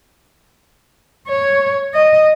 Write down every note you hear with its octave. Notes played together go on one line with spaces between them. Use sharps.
C#5
D#5